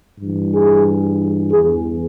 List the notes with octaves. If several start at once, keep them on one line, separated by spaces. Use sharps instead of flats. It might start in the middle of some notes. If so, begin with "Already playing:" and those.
G2 E3
G#4
E2 E3 G#4